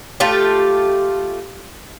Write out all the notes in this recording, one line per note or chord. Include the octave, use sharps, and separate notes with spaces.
A3 F4 G4